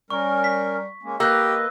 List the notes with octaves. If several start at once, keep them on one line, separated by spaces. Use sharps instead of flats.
G3 C#4 A#4 C#6
B6
G#3 A#3 C#4
A#3 G4 B4 D#5 E6 F#6